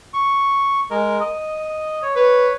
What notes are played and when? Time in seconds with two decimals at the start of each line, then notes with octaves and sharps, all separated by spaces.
0.14 C#6
0.90 G#3 A#4
1.20 D#5
2.02 C#5
2.16 B4 C#5